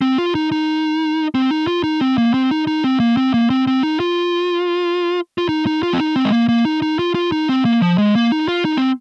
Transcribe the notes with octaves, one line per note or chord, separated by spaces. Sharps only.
C4
F4
D#4
D#4
C4
D#4
F4
D#4
C4
A#3
C4
D#4
D#4
C4
A#3
C4
A#3
C4
C4
D#4
F4
F4
D#4
D#4
F4
C4
D#4
C4
G#3
A#3
A#3
D#4
D#4
F4
F4
D#4
C4
A#3
F3
G#3
A#3
D#4
F4
D#4
C4